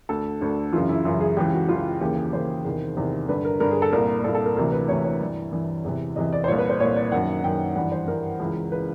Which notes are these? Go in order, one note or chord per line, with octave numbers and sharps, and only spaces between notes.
D2 D3 A4
D2 D3
F#2 C#3 E3 F4
E4
F#2 C#3 E3 F4
G#4
C#2 C#3 E3 G4
F#4
C#2 C#3 E3 F4
D#2 C#3 E3 G4
G#4
D#2 C#3 E3 C5
E2 C3 D#3
E2 C3 D#3
G2 D3 B4
A#4
G2 D3 A#4
G#4
A4
C2 A#2 A#4
C2 A#2 A4
A4
A#4
D2 C3 E3 A#4
B4
D2 C3 E3 C#5
C#5
G2 E3 D5
G2 E3
E2 C3 E3
E2 C3 E3 D#5
D5
C5
C2 A#2 C#5
B4
C5
C2 A#2 C#5
D5
F#2 D#3 F#5
F#2 D#3 G5
G2 E3 F#5
C5
G2 E3 A#4
C#2 C#3 E3
C#3 E3 B4